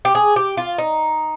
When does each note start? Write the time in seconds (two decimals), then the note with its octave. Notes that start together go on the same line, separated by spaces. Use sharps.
0.05 G4
0.15 G#4
0.36 G4
0.57 F4
0.78 D#4